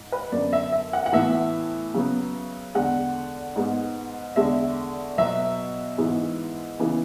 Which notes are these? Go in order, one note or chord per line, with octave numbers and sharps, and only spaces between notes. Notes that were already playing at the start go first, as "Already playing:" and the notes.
Already playing: G#2
B4
F#2 D3 F#3 B3 D5
E5
E5
F#5
F#5
A2 E3 B3 E5
C#3 F#3 B3
E2 D3 G#3 F#5
G#2 G#3 B3
E2 D3 G#3 E5
B2 F#3 B3 E5
G#2 E3 G#3 B3
C#3 E3 B3